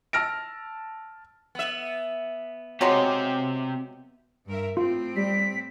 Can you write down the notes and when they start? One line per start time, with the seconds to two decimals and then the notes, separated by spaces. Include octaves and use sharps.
0.13 A5 E6 F6 A#6 D7
1.55 B3 E5
2.81 C3 F#3 G#3 G4
4.46 G2 A#4 E5
4.77 A2 C4 F4
5.16 G3 B6